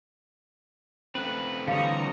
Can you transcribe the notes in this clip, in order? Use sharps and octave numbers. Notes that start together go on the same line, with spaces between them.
A3 C4 C#4 B4
D3 E3 G3 C#5 D#5 F5 A#5